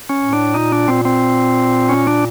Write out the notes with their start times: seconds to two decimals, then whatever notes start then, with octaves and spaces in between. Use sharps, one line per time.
0.09 C#4
0.21 A2
0.33 D4
0.54 A#2 D#4
0.72 D4
0.88 A#2 C4
1.05 C4
1.89 C#4
2.07 D4